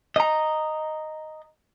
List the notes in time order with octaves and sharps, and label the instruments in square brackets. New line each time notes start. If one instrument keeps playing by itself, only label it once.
[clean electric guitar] D#5 A#5